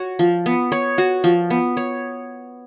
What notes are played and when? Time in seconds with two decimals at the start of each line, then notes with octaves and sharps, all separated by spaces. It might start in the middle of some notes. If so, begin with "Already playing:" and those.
Already playing: F#4 C#5
0.19 F3
0.46 B3
0.72 C#5
0.98 F#4
1.24 F3
1.50 B3
1.77 C#5